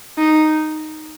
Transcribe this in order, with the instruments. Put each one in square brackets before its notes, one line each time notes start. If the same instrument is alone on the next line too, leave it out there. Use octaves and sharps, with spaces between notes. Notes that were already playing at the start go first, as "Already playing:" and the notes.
[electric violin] D#4